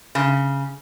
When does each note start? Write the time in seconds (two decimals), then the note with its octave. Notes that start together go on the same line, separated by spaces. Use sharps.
0.15 C#3